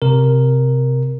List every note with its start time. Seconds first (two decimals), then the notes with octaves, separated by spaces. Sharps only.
0.02 C3 A#4